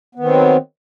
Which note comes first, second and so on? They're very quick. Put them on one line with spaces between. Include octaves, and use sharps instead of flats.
B3 D#3 C4 F#3